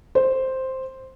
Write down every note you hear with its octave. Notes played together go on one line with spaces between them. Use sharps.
C5